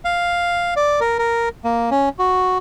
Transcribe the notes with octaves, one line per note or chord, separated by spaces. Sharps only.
F5
D5
A#4
A#4
A#3
C#4
F#4